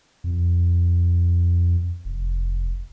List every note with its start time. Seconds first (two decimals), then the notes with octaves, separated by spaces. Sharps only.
0.24 F2
2.05 F1